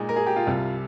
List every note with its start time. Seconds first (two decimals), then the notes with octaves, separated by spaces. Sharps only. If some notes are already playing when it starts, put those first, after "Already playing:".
Already playing: A#2 G#3 D#4
0.09 A#4
0.16 G#4
0.27 G4
0.36 F4
0.47 C2 C3 G3